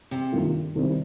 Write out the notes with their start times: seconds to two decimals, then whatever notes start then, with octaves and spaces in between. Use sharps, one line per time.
0.11 C3
0.32 G2 D#3 A#3 F4
0.75 C2 C3 D#3 G3 C4